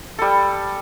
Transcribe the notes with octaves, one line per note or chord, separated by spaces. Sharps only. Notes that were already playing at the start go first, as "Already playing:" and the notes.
G3 A4